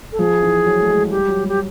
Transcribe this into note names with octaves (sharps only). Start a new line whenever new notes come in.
A4
F3 G#4
E3
F#3
A3
G#3
G3 G4
F#3
G3
G4